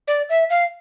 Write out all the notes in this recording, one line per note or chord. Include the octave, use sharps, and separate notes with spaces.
D5
E5
F5